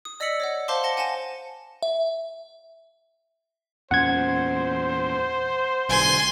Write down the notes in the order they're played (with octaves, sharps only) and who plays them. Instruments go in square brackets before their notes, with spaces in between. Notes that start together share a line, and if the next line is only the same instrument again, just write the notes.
[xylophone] D#6
D5 D#5 E6 B6 C#7 F#7
C#5 D#5 F#5
C5 F5 A5 C6 D6
F#5 A5 A#6 C#7 G7
F#5 G#5 A5 A#6 E7
[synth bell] E5
[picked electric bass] E2 A#2 C#4 [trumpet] C5 [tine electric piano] F#5 G#6
[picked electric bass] B1 D3 [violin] G#5 C6